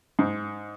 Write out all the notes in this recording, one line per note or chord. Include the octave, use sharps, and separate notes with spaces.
G#2